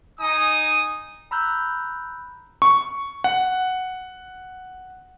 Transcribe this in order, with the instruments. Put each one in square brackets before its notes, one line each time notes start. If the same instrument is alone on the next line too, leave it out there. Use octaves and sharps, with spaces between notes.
[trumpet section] D#4 G#5 D#6
[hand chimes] A#5 B5 E6 F#6 G6
[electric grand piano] C#6
F#5